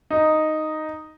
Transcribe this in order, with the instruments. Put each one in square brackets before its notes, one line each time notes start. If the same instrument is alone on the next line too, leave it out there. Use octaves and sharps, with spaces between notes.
[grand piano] D#4